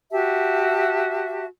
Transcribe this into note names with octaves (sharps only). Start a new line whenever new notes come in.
F#4 G4 E5 A5